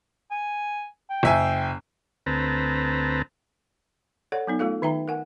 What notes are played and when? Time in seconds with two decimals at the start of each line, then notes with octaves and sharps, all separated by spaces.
0.31 G#5
1.10 G5
1.23 F#1 E5 G#5
2.26 D2 C4 B4 A5 A#5
4.32 A4 C#5 D5 F#5
4.47 F#3 B3 D#4
4.59 A3 F4 A4 F5
4.82 D#3 D#4 E5 G5 A#5
5.08 A#4 F#5 G#5